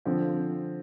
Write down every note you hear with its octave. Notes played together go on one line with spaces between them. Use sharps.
D3 F3 C4